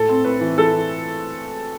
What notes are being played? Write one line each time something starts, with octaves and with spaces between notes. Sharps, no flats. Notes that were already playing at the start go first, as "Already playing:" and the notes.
Already playing: A2 A3 A4
C4
A2 B4
E3
E3 A4
E3